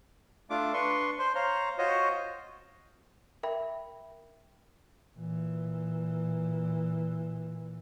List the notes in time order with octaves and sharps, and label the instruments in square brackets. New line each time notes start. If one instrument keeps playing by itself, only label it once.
[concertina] A3 D4 F4 D6
D4 B4 C6 C#6
C5 C6
C5 C#5 F5 A#5
F4 F#4 C5 C#5 D#5
[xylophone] A#4 E5 G5 B5
[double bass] A#2 E3